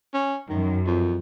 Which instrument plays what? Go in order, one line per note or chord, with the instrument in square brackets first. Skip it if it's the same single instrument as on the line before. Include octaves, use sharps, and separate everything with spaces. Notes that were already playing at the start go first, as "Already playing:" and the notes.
[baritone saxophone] C#4
[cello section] F#2 [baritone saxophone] D#3
[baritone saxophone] F2